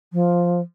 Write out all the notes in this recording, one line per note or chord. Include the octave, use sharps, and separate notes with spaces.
F3